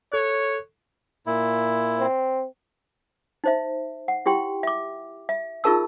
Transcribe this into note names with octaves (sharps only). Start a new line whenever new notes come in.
A4 C#5 F#6
A#2 E4
C4
D#4 C5 E5
F#5
E4 G4 G5 C6
E5 D6
E5
D#4 F4 G#4 A#4 A5 E6